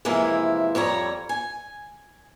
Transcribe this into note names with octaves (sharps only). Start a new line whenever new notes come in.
C3 E3 F3 G#3 A#3 E4
F2 G3 C#5 A#5
G#5